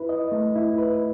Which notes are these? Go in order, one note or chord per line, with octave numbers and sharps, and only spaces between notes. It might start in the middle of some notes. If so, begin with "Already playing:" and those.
Already playing: E4 B4
D#5
A3
E4
B4